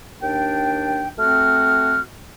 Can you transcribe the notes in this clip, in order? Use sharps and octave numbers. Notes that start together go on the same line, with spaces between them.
D#2 D4 G5
A3 C4 F#4 F6